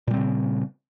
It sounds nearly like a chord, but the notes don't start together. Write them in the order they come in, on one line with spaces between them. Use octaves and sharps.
A#2 G3 C4 C#3